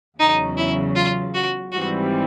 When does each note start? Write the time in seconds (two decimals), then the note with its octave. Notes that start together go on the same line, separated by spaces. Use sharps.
0.19 E2 C#3 F#3 D#4
0.57 E4
0.96 F4
1.34 F#4
1.72 G#1 G#2 E3 G3 C4 F#4